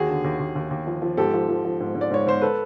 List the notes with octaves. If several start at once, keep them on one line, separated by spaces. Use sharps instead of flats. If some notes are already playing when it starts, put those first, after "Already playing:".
Already playing: D#2 F#4 G#4
D3
D#2
D#2
D#2
D#2
F3
F3
G#2 G4 A4
F3
F3
F3
G#2
G#2
D5
G#2 C#5
G#2 C5
A4 B4